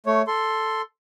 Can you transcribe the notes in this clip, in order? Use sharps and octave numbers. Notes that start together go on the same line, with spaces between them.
A3 C#5
A4 C6